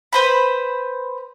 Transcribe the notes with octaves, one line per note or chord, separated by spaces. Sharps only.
B4 C5 B5